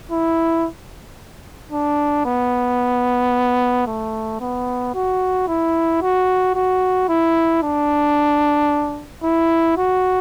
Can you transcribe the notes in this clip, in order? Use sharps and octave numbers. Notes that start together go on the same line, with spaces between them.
E4
D4
B3
A3
B3
F#4
E4
F#4
F#4
E4
D4
E4
F#4